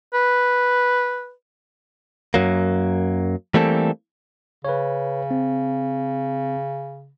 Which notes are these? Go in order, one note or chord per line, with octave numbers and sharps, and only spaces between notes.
B4
F#2 F#3 A#3
E3 G3 A3 A#3 C4 A4
C#3 B4 C#5
C4